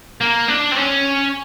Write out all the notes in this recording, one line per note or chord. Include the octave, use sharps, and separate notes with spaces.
A#3
D4
C4
C#4